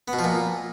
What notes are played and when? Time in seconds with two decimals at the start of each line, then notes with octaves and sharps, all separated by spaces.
0.08 B3
0.13 B2
0.19 F3
0.24 A#2